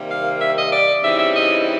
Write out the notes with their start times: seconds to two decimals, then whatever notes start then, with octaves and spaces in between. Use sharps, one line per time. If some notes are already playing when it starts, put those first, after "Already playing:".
Already playing: C3 D#3 G3 A#3
0.10 F5
0.40 E5
0.57 D#5
0.72 D5
1.03 C#3 E3 G3 C4 D#4 E5
1.18 E5
1.34 D#5